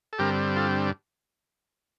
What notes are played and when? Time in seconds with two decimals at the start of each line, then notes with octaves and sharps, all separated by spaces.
0.13 A4
0.19 G2 D3 G3 C4 G4 A#4
0.56 F4 A4